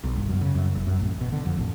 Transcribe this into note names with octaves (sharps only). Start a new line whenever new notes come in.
B1
G1
F#2
C#3
F#2
F#1
F#2
A1
B2
D3
F2
A1